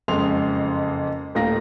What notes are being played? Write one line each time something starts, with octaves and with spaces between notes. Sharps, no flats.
F#1 F2 G#3 C6 F7
D#1 D#2 A2 F4 A#5 A#6